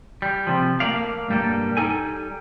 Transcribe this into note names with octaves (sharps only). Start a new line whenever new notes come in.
G3
C3 F3
A3 A#3 D5 F5
B1 G2 G3 A#3 A4
G3 D#4 A4 G#5